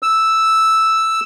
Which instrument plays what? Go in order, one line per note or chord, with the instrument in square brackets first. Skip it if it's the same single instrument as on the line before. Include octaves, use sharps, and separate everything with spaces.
[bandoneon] E6